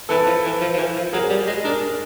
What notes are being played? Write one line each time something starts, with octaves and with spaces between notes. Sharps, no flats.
E3 A4 B4
F3
E3
F3
F3
E3
F3
F#3 G#4 A#4
G3
G#3
D4 G#4 A#4